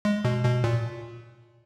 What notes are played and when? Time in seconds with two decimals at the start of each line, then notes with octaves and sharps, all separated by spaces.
0.05 G#3
0.25 B2
0.45 B2
0.64 A#2